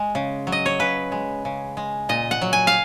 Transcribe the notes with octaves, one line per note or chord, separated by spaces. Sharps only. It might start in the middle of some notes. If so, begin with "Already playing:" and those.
Already playing: G#3
C#3
F#3
D#5
C#5
C#3 B4
G#3
C#3
G#3
A#2 D#5
F#5
F#3
G#5
F5